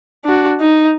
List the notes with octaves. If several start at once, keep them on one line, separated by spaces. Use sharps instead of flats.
D4 F#4
D#4